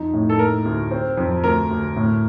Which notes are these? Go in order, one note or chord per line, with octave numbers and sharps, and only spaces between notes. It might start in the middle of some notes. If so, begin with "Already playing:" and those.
Already playing: F2 D#4
A2
A4
A#3 A#4
D2
C4
F2
D2 A#4
D2
A2